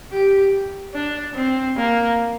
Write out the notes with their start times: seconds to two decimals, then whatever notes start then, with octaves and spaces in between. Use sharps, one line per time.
0.12 G4
0.95 D4
1.35 C4
1.77 A#3